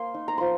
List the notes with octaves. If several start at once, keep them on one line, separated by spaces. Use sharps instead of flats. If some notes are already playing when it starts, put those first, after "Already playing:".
Already playing: A#3 C6
D#4
A#5
F3 C6